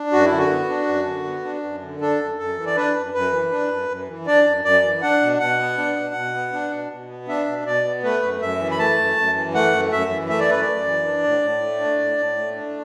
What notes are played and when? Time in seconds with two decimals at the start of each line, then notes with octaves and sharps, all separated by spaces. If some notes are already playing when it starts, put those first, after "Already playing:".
Already playing: D4
0.13 F#2 F#4
0.26 E4
0.31 D3
0.39 F#4
0.50 B3
0.69 D4
0.88 F#2
1.07 D3
1.26 B3
1.44 D4
1.63 F#2
1.82 D3
2.01 D4 A4
2.20 F#2
2.38 F#2 A4
2.57 E3
2.66 D5
2.76 D4 B4
2.95 F#2
3.14 F#2 B4
3.33 E3
3.51 D4
3.71 F#2
3.89 F#2
4.08 E3
4.27 D4 D5
4.46 F#2
4.65 F#2 D5
4.83 E3
5.02 D4 F#5
5.21 B2
5.40 B2 F#5
5.59 B3
5.77 D4
5.96 B2
6.15 B2
6.34 B3
6.53 D4
6.71 B2
6.91 B2
7.09 B3
7.28 D4 E5
7.47 B2
7.66 B2 D5
7.85 B3
8.03 A3 B4
8.22 F#2
8.41 F#2 E5
8.60 E3
8.71 B5
8.79 A3 A5
8.98 F#2
9.16 F#2
9.35 E3
9.54 A3 F#5
9.73 F#2
9.92 F#2 E5
10.11 E3
10.29 A3 E5
10.40 D5
10.49 F#2 B4
10.61 D5
10.67 F#2
10.86 E3
11.05 D4
11.24 A2
11.43 A2
11.62 A3
11.80 D4
11.99 A2
12.18 A2
12.37 A3
12.55 D4